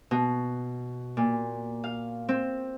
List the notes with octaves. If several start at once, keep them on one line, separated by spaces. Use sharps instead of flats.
B2
A#2
F5
C4